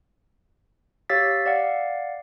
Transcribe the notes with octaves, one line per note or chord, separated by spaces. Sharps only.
G4 C#5 F5 E6 A6 B6
D5 F5 F#5